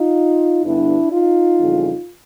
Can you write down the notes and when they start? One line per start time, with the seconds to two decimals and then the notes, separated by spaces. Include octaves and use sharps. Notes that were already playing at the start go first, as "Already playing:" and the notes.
Already playing: D#4 F4
0.64 G2 D3 G3 B3 D4 E4
1.11 D#4 F4
1.58 F2 C#3 E3 G3